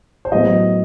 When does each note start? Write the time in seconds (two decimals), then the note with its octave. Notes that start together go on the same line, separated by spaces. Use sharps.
0.25 C5
0.32 A2 F#3 B3 D#5